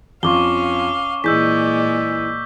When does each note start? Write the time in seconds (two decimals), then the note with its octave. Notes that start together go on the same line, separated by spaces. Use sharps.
0.23 F2 C#4 F4 F5 C#6 D6 G7
1.24 A#2 E3 G#3 G#4 D5 E6 G6 B6